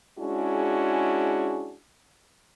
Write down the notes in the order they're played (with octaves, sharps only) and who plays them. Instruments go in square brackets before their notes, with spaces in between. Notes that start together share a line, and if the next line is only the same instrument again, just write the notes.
[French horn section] G#3 C#4 D4 E4 F#4 G#4